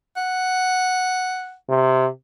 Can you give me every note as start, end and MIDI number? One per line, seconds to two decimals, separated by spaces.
0.17 1.55 78
1.69 2.07 48